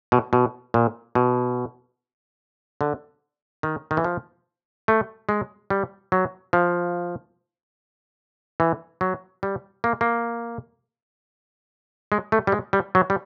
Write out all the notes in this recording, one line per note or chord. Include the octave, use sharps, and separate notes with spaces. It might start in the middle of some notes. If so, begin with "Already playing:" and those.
B2
B2
A#2
B2
D3
D#3
D#3
E3
F3
A3
G#3
G3
F#3
F3
E3
F#3
G3
A#3
A#3
G#3
A3
G3
G#3
G3
F#3
G3